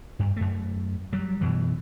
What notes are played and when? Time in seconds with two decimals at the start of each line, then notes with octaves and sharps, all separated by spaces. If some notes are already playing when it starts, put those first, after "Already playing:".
0.19 G2
0.37 F#2 A3
1.13 F#3 G3
1.41 F#2 B2 E3